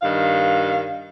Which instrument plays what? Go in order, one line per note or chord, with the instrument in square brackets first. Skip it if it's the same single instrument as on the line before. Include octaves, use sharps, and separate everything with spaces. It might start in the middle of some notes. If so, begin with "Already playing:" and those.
[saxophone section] G2 D#3 F5